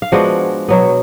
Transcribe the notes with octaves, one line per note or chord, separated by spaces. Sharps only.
F5
F3 G#3 B3 D4 F#4 F#5
B2 F#3 B3